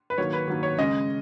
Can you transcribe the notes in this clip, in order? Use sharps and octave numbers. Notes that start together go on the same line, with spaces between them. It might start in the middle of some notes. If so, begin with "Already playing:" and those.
B4
D#3 F#3 A#3 C#5
B4
D#3 F#3 A#3
C#5
C#3 G#3 C#4 D#5